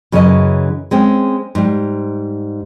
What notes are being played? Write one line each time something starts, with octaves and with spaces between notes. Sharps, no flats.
F#2 C#3 E3 F#4 D#5
G#3 C4 C#4
G#2 G3